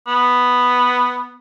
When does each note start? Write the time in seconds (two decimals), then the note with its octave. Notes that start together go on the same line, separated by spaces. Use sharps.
0.08 B3